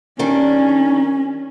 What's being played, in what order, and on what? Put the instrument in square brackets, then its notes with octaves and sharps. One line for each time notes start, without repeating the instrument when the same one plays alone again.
[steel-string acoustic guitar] D#3 G3 D4 [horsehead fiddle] C#4